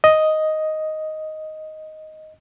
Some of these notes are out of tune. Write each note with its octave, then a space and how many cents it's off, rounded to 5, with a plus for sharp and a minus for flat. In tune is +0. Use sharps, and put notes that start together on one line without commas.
D#5 +5